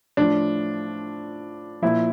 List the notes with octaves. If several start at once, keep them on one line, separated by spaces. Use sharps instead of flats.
A2 F3 D4
A#2 F3 E4